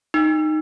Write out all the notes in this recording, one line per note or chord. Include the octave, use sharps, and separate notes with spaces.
D#4